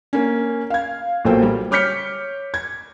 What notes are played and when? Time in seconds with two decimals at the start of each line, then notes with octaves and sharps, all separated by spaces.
0.13 A#3 C#4
0.70 F5 G#6
1.25 B1 A#2 A#3 A4 C5 G5
1.43 G3
1.71 C#5 D6 F6 G6 B6 C#7
2.54 G#6